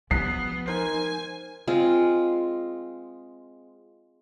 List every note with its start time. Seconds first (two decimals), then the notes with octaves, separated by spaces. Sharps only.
0.11 F3 B3 D#6 F#6 C7
0.68 D#4 A#4 C5 G#5
1.67 G#3 C4 F4